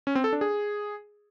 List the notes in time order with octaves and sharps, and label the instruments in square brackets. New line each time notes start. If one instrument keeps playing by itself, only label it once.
[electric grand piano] C#4
C4
A4
D4
G#4